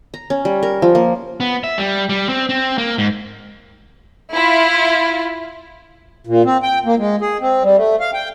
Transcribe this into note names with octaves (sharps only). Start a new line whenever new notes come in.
A#5
C#4
G3
A#4
F3
A#3
B3
E5
G3
G3
C4
C4
A#3
G#2
E4 F4
A#2
C4
G5
A#3
G#3
G#4
C4
G3
A3
F5
G5